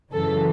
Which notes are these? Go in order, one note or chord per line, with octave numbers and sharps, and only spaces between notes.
F#2 C#3 E3 A4